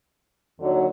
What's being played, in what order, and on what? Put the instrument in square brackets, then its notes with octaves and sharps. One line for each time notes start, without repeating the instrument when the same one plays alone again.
[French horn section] D#2 D3 F#3